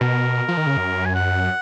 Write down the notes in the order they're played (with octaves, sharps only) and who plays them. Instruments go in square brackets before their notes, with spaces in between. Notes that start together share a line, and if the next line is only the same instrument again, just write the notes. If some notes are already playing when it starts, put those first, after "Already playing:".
[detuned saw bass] B2 [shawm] A#4
[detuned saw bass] F3
D#3
C#3
F#2
[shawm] G#5
F#5